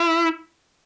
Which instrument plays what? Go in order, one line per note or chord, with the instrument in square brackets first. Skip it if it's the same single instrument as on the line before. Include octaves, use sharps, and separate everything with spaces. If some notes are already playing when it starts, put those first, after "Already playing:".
Already playing: [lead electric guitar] E4